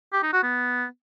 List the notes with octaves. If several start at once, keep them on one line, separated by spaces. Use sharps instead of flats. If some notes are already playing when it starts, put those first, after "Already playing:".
G4
D#4
F#4
B3